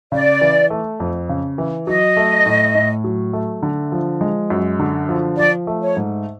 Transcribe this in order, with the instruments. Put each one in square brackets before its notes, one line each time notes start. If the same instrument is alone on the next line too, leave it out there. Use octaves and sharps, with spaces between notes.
[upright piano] C#3 [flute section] D5
[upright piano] E3
A3
F2
C#3
E3
[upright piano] F#3 [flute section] D#5
[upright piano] A3
A2
A2
F#3
A3
D3
F3
G#3
F#2
D3
F3
[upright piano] F3 [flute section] D5
[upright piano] A3
[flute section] C#5
[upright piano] G#2